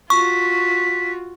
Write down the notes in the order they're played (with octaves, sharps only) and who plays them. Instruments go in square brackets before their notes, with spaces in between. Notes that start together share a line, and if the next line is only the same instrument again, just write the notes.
[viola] F4 F#4 [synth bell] C#6 [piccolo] B6